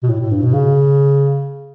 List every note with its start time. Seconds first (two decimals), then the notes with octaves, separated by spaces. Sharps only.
0.03 B2
0.09 A2
0.20 A2
0.31 G2
0.42 B2
0.53 C#3